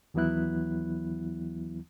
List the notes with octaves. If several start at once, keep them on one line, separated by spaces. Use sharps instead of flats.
D#2 E3 F#3 B3 E4 F#6